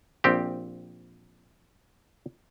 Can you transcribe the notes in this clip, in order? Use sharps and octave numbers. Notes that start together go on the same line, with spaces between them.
A#1 C4 G4